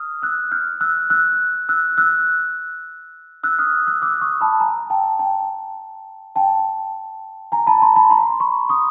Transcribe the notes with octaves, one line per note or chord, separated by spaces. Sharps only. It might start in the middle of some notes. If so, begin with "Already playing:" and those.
Already playing: D#6 F6
E6 F#6
F6 G6
E6 F#6
E6 F#6
E6 F#6
E6 F#6
E6 F#6
D#6 F6
E6 F#6
D6 E6
C#6 D#6
A5 B5
G#5 A#5
G5 A5
G5 A5
G5 A5
G#5 A#5
A5 B5
A#5 C6
A5 B5
A#5 C6
B5 C#6
C#6 D#6